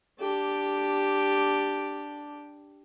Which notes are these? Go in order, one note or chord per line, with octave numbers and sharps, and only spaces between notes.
D4 G4